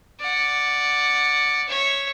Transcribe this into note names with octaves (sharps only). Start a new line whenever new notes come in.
D5 F#5
C#5 E5